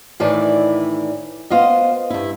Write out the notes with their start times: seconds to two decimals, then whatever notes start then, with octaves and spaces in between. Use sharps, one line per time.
0.20 A2 D#3 E3 E4 D5 A5
1.50 B3 F4 C5 D#5
2.10 G2 E4